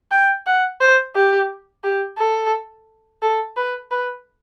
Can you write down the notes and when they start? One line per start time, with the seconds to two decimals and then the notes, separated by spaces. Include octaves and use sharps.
0.11 G5
0.46 F#5
0.81 C5
1.15 G4
1.84 G4
2.18 A4
3.22 A4
3.56 B4
3.91 B4